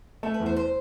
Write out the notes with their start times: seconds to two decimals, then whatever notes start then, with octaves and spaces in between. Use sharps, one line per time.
0.23 A3 A4
0.34 B4
0.40 E2
0.46 C5
0.56 C5